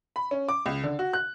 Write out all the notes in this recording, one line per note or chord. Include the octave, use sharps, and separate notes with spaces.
B5
C#4
D6
C#2
D3
F#4
F#6